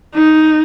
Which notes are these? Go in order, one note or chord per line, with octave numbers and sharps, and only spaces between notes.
D#4